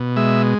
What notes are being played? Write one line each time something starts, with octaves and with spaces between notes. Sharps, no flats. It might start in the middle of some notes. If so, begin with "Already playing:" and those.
Already playing: B2
G#3 E5